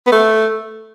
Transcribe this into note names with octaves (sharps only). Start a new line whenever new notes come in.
B3
A3